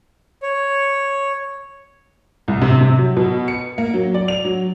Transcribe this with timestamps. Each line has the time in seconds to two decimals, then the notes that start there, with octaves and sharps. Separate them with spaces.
0.43 C#5
2.48 C2
2.61 C3
2.81 C3
2.98 F#3
3.17 B2
3.48 C#7
3.78 A#3
3.94 F#3
4.14 D5
4.28 F7
4.45 F#3